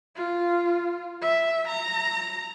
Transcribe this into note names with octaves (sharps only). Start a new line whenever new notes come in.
F4
E5
A#5